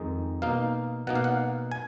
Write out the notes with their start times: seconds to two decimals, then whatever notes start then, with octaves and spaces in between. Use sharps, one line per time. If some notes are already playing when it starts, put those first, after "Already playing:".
Already playing: F2 D#3 G#3 D#4
0.42 B2 A#3 D#4 F5
1.07 B2 A#3 D#4 F#5
1.15 F5
1.24 F#5
1.71 G#5